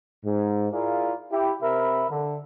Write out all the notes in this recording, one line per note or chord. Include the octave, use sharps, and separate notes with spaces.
G#2
E4 F4 G#4 A#4 D5 F5
E4 G4
C3 A#4 E5 B5
D3